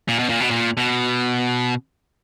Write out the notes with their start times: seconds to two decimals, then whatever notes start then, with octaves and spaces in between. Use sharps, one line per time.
0.08 A#2
0.19 B2
0.29 A#2
0.40 B2
0.51 A#2
0.77 B2